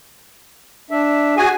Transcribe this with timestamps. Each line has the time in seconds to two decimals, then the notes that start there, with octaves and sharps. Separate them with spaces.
0.91 D4 E5
1.37 F#4 G#4 G#5